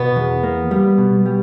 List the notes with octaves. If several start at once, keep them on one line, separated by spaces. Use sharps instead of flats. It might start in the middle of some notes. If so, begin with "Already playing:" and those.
Already playing: B2 B3
E2
A#3
G3
B2
G3